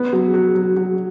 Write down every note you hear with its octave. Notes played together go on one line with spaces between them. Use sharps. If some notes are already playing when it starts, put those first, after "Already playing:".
Already playing: B3
F#3
F#3
F#3
F#3